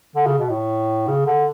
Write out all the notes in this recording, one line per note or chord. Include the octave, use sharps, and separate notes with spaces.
D3
C#3
B2
A2
C#3
D3